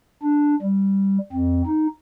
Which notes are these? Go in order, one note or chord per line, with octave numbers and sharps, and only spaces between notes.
D4
G3
F2 C4
D#4